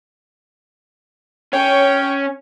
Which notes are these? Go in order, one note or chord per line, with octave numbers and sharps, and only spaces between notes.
C#4 C#5 G5